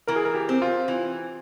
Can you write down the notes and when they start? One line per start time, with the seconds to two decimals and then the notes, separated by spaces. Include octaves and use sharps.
0.07 E3 A#4
0.16 G#4
0.25 A#4
0.35 G4
0.49 C4
0.62 F4
0.88 E3